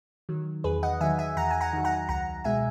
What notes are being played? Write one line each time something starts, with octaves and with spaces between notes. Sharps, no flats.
D#3 F#3
E2 G#4 B4
D#5 F#5
D#3 F#3 E5 G#5
E5 G#5
E2 F#5 A#5
G#5
F#5 A#5
D#3 F#3
F#5 A#5
C#2 F#5 A#5
B2 G#3 E5 G#5